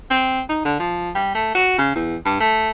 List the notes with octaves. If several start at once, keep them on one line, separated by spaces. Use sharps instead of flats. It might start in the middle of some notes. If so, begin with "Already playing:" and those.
C4
D#4
D3
F3
G3
A3
F#4
C#3
E2
G2
A3